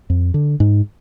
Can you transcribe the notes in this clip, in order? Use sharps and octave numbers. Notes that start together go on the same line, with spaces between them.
F2
D3
G#2